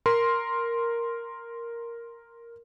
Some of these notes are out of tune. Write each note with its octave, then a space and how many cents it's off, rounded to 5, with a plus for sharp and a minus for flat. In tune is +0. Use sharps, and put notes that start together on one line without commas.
A#4 +0 C6 +0